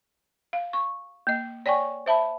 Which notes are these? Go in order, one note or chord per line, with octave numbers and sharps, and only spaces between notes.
F5
C#6
A#3 D#5
C#5 D5 G5 G#5 C#6
C5 E5 A5 B5